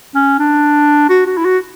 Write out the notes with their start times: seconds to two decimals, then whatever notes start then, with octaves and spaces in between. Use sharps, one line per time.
0.15 C#4
0.39 D4
1.09 F#4
1.27 F#4
1.37 E4
1.45 F#4